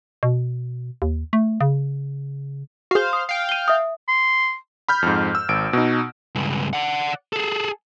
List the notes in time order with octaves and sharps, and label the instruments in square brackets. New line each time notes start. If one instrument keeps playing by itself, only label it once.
[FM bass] B2
D#2
A3
C#3
[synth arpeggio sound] F#4 G#4 [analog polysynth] C5 F5
[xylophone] D#6
[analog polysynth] F5 G5
[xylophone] D#7 G7
E5 D#6
[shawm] C6
[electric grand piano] B5 F6 G6
F2 G#2
E6
G#1 D7
B2 D#4
[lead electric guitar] C#2 G2
D5 F#5
G#4 A4